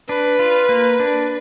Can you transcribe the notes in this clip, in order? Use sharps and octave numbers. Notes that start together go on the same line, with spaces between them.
D4 B4
F4
A#3
D4